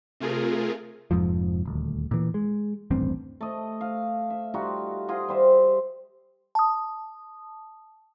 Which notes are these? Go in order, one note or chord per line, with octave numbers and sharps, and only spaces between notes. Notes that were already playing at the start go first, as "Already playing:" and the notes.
C3 A3 F4 G#4 A#4
F1 F2 G#2 F3
D#1 D2
A#2 E3
G#3
D#1 A1 G2 C4
A3 D#5
F5
E5
G3 D#4 F4 F#4
F4 G#4 D#5 F#5
G3 C5 E5
A5 D#6